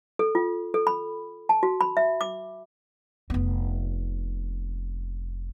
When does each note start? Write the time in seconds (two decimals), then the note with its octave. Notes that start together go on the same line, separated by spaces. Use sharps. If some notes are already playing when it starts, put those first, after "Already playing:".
0.19 A4
0.35 F4
0.74 A4
0.87 B5
1.49 A5
1.63 F#4
1.81 B5
1.97 E5
2.21 D6
3.30 F1 B3